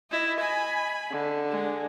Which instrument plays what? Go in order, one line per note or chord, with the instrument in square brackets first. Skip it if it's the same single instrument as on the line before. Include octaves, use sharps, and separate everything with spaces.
[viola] E4 [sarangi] D#5
[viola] G#5 B5
[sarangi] D3
[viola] G#3